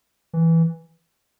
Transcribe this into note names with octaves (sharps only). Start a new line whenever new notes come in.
E3